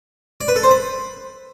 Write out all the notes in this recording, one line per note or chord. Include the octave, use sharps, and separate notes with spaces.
D5
B4
A4
C5
B5